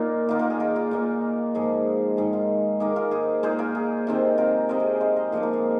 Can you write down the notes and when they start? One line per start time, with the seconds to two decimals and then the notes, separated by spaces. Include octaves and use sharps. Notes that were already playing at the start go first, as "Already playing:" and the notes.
Already playing: A#2 A#3 D#4 F4 A#4
0.29 D#3 A#3 D#4 F4
0.39 F4 A#4
0.50 G#4
0.60 F4 A#4
0.76 F4
0.91 A#2 A#3 D#4
1.54 G#2 F3 A#3 D#4 G#4
2.17 G#2 D#3 G#3 G#4
2.33 F4
2.80 D#3 A#3 D#4 G#4
2.96 F4 A#4
3.11 G#4 C5
3.43 A#2 G#3 D#4 G#4 C5
3.59 F4 A#4
3.75 G#4
4.07 C3 D#3 C4
4.38 F4 A#4
4.69 C3 G#3 C4 A#4 D#5
4.80 G#4
5.01 C5 F5
5.16 A#4 D#5
5.32 A#2 F3 A#3 D#4 G#4
5.43 F4 A#4
5.53 G#4